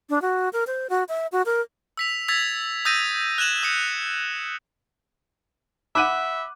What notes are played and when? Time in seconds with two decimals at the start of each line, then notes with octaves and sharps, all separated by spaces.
0.10 D4
0.22 F#4
0.53 A#4
0.67 C5
0.90 F#4
1.09 E5
1.32 F#4
1.46 A#4
1.97 E6 B6 F7
2.28 E6 G#6 A6 B6 F7
2.85 D#6 E6 G6 A6 A#6 D#7
3.38 F#6 G#6 E7 F#7
3.63 D#6 C#7
5.95 E5 F#5 B5 D6 F#6 D#7